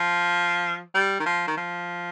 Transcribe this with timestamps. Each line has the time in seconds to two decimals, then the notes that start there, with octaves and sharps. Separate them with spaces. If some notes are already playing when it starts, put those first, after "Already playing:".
Already playing: F3
0.94 G3
1.20 D#3
1.26 F3
1.47 D#3
1.57 F3